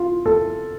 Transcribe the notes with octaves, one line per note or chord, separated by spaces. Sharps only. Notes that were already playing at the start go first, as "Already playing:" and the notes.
Already playing: F4
A4